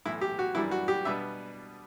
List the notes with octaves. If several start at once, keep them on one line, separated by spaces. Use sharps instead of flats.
B1 A2 E3 E4
G4
F#4
F#2 E3 G3 D4 E4
F#4
G4
B2 G3 B3 D4 E5